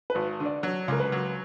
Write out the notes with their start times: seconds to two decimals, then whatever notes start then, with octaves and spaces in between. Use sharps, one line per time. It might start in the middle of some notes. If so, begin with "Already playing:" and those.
0.10 B4
0.15 G#1
0.40 D3
0.46 D5
0.63 F#3 C#5
0.88 C#2 A#4
1.00 B4
1.12 F#3